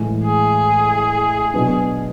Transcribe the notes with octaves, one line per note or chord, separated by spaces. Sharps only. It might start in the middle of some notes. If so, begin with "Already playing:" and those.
Already playing: A2 E3 G#3
G#4
B2 F#3 B3 D4